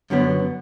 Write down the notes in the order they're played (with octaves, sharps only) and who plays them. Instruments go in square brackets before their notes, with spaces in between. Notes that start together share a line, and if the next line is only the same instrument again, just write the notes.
[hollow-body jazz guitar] F#2 D3 F#3 B3